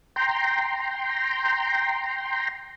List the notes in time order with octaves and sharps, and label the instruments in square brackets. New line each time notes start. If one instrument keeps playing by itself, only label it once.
[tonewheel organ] G5 A#5 C6